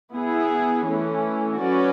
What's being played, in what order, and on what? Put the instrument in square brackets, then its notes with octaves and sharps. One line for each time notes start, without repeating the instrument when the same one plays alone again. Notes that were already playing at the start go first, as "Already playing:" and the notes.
[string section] B3 E4 G#4
E3 A3 C#4
F#3 C#4 F#4 B4 D5